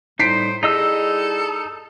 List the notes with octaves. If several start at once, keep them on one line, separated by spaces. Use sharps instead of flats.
A2 G3 D#4 C5 B6 C7 D7
G3 D#4 E4 G#4 A4 D#5 E6